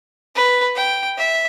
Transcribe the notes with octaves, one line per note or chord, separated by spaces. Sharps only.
B4
G5
E5